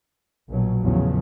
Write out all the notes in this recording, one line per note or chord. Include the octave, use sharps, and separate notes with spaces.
A#1 B2 F#3
A1 E2 C#3 F3 F#3